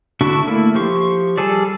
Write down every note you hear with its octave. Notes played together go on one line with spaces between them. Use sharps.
D3 D4 E4 F#4 C#6
A3 A#3 E4
F3 G4 C6 C#6
G3 G#4 A4 D5